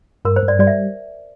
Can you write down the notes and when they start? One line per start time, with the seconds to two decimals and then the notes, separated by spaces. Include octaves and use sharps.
0.25 G2 A#4
0.36 C5
0.43 G2
0.48 D5
0.59 G3 D5
0.67 E5